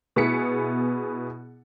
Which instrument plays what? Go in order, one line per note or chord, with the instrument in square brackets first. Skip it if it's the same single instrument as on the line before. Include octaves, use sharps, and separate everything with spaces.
[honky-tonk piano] B2 B3 E4 G#4 B6 C#7